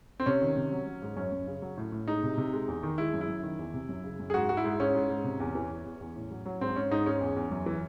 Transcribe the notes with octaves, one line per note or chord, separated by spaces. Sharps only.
C4
C3 C#4
D#3
C3
F#3
F#3
G#2
F#2 C#4
F#2
C#3
F#3
A2
A2
G#3 D#4
C3
C3
G#3
E2
D#3
G#3 E4
F#2
E4
F#2
D#3
E2
C3
F#2
C#3
F#2
G#4
G#2 F#4
G#3 F#4
E4
G#2
G#2 C#4
G#2
G#2
C3
E2
E3
E2
E2
E2
A2
F#3
F#3
G#2 C4
G#2 C#4
G#2 D#4
G#3 C#4
E2
E2
F#2
E3